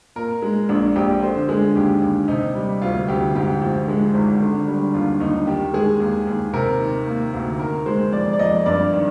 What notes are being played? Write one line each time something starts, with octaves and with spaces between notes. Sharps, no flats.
A#2 A#4
G#3
A#1 D4
A#1 G4
D3 C5
G#3 G#4
D#2 G4
D#2
C3 D#4
G3
D2 F4
D2 G4
G#2 G4
F3
G#3
G#1
D3
G3
D#2 F4
D#2 D#4
D#3 G4
G#3 G#4
D#2
D#2
C3 A#4
D#3
A#3
D2
D#3 A#4
G#3 C5
F2 D5
D5
F2 D#5
G2 D5
D#3